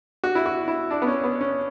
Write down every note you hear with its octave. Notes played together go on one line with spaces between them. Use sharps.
F#4
E4
F#4
E4
D4
B3
C#4
B3
C#4